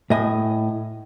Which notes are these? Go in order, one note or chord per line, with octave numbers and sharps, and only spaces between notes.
A2 D#5 G#5